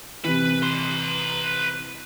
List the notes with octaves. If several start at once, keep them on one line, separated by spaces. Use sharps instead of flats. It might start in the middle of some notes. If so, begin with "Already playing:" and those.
C3 E3 B4
B4 C6